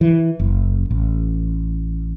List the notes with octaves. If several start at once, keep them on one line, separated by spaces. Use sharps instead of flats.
E3
F#1
A1